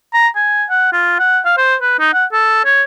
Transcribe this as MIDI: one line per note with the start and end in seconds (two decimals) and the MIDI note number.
0.14 0.28 82
0.36 0.64 80
0.70 0.92 78
0.93 1.17 65
1.19 1.40 78
1.45 1.56 77
1.57 1.75 72
1.81 1.95 71
1.99 2.13 63
2.14 2.25 78
2.33 2.62 69
2.65 2.83 73